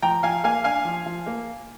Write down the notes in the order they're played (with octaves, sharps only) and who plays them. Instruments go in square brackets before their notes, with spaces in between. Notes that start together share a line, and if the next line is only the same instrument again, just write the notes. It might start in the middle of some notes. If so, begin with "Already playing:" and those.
[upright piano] F3 G5 A#5
F3 F5 G#5
A#3 F5 G#5
D4 F5 G#5
F3
F3
A#3